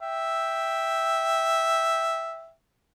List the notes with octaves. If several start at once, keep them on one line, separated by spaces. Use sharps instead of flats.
E5 G5